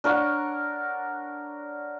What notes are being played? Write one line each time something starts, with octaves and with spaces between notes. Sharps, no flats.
D4 A#4 C#5 F#5